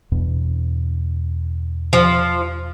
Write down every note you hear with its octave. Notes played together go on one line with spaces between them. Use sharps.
E2 G2 B2
F3